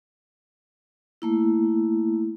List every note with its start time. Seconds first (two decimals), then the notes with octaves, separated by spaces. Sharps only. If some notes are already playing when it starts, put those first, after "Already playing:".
1.22 A3 A#3 E4